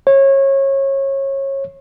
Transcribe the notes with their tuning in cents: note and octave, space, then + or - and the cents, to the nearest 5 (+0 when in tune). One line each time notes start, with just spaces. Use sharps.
C#5 -25